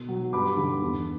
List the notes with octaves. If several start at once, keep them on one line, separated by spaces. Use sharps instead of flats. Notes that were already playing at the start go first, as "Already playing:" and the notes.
Already playing: B2
F#3
G2 B5 D6
D3 G3
E2